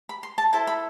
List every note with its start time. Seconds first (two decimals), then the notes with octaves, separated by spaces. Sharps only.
0.09 B5
0.23 C6
0.38 A5
0.53 E4 A4 C5 A5
0.67 B5